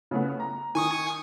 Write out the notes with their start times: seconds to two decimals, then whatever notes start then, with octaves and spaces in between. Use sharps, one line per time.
0.11 C#3 A3 B3
0.40 A#5
0.75 D#3 G#5 C#6 D#6